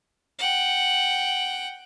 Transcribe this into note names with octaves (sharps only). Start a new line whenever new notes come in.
F#5 G5